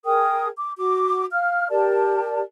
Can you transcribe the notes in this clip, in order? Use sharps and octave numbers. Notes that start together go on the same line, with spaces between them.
G#4 A#4 G5 D#6
D6
F#4 D6
F5 F6
G4 A#4 D5 A5